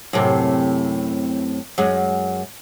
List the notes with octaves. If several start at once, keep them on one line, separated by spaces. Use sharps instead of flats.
F#2 A2 C3
F#2 G#3